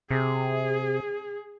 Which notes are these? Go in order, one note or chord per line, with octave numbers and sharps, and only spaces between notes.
C3 G#4